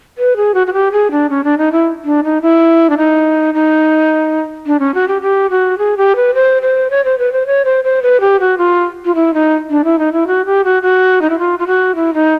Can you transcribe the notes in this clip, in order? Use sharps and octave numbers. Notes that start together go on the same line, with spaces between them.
B4
G#4
F#4
F#4
G4
G#4
D4
C#4
D4
D#4
E4
D4
D#4
E4
D4
D#4
D#4
D4
C#4
F#4
G4
G4
F#4
G#4
G4
B4
C5
C5
C#5
C5
B4
C5
C#5
C5
C5
B4
G4
F#4
F4
F4
E4
D#4
D4
E4
D#4
E4
F#4
G4
F#4
F#4
D#4
E4
F4
F4
F#4
E4
D#4